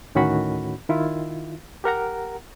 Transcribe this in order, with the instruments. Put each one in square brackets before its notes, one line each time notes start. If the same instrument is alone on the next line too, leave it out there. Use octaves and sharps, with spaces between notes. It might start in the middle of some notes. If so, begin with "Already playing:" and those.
[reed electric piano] D2 A2 D#3 C#4 F#4 B5
D#3 E4 F4
G4 A#4 F#5 A#5